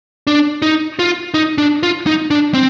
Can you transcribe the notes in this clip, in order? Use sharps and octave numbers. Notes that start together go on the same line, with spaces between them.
D4
D#4
F4
D#4
D4
F4
D#4
D4
C4